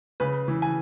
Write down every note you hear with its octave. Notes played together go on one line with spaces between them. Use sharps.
C#3 B4
E3
G#5